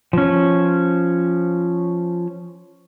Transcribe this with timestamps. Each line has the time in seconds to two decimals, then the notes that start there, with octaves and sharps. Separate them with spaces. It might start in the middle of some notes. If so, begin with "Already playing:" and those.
0.13 F3 C#4